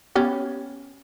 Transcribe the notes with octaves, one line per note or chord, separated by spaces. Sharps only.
B3 C#4 G4